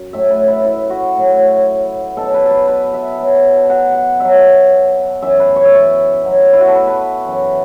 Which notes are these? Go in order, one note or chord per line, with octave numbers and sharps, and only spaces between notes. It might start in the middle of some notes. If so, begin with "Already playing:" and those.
Already playing: F#2
A2 F#3 E5
B4
E4
E4
F#4
A2 F#3
B2 F#3 A4
B4
A4
B4
B4
E5
B2 F#3
F#5
F#5
B2 F#3 E5
F#2 E3 E5
B4
C#5
E5
C#5
B2 F#3
E4
F#4
A4
B4
B4
F#2 E3